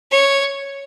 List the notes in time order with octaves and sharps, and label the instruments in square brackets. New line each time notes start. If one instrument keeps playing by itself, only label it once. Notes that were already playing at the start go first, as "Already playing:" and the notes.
[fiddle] C#5